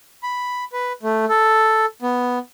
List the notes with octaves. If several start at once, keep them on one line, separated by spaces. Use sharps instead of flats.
B5
B4
A3
A4
B3